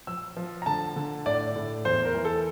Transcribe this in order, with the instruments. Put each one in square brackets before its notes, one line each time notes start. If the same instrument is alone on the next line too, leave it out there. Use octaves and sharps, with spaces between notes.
[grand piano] F3 E6
F3
A#5
D3 A5
D3
A2 D5
A2
E2 C5
A#4
E3
A4